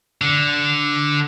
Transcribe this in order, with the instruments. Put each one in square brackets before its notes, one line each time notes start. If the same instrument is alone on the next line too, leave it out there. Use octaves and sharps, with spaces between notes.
[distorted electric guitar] D3